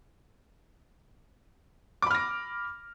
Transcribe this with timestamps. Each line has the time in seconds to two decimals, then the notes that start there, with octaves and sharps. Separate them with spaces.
2.02 D6
2.07 B5
2.11 F6
2.15 A#6